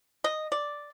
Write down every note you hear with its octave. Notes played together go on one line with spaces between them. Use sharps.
D#5
D5